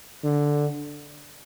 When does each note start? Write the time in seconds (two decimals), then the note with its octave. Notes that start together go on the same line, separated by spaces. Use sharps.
0.24 D3